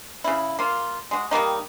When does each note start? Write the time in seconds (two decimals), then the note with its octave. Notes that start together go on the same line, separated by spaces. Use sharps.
0.24 C#3 E4
0.59 A#3 F4
1.11 G#3 F#4
1.31 D#3 G3 A#3 D#4